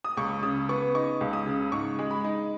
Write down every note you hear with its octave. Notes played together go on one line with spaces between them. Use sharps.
D#6
C#2 C#6
C#3 D#6
B3 C#6
D#4 C#6
C#2
D#6
C#3
G#2 C#6
G#3
B5
D#4